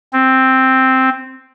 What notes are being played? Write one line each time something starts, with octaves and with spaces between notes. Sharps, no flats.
C4